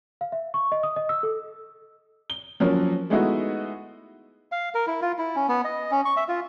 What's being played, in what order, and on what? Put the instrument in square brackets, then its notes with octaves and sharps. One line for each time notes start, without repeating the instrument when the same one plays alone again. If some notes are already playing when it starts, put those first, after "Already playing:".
[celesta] F5
E5
C#6
D#5
D#6
D#5
E6
A4
[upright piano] G7
F3 F#3 A#3 C#4
G#3 A3 B3 D#4 E4 F#4
[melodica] F5
A#4
E4
F4
E4
C#4
B3
D#5
C#4
C#6
E5
F4